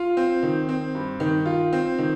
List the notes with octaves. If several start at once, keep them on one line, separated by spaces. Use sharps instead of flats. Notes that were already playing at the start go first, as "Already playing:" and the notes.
Already playing: F4
C4
D#3
C4
G2
D#3
F4
C4
D#3